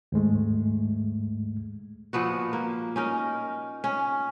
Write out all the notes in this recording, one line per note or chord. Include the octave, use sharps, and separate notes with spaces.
D#2 G#2 G#3 A3
A#2 F3 B3 F#4
A#3
C#4 D#4 A#4
C#4